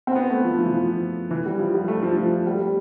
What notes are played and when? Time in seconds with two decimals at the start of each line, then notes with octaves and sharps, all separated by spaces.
0.07 C4
0.15 B3
0.30 A3
0.45 F3
0.59 F3
0.66 E3
0.73 F3
1.31 E3
1.46 G3
1.59 F3
1.74 G3
1.88 A3
2.03 F3
2.17 F3
2.46 G3
2.60 G3